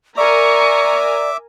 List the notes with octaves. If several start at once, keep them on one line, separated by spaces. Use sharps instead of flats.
A#4 D5 E5 G#5 A#5 C#6 D6